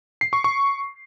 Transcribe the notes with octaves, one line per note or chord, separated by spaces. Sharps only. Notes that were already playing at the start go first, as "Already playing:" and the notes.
C7
C#6
C#6